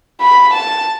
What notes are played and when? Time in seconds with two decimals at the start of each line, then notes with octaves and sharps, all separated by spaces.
0.21 B5
0.54 A5